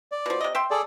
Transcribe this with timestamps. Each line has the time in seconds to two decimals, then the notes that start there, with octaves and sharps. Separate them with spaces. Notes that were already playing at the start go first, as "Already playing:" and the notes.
0.12 D5
0.26 B2 F3
0.41 C3 D#5
0.55 E5 G5 C6
0.71 G#4 A4 D5